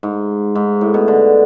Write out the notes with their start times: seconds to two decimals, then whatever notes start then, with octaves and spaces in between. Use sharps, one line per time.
0.03 G#2
0.55 G#2
0.81 A2
0.94 B2
1.08 D3